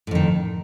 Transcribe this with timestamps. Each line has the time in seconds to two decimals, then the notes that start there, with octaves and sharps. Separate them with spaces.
0.07 A2
0.11 F2
0.15 D#3